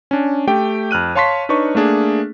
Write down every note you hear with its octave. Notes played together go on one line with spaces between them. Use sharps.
C#4 D4
A3 G4 G5
F2 F6 F#6 D#7
C#5 F5 A5 C6 C#6 B6
D4 D#4 B4 C#5 C#6
A3 A#3 D4 G#4